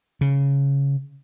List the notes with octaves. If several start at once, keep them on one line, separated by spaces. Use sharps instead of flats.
C#3